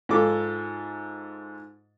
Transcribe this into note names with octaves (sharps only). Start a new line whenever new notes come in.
G#2 F4 A4 D6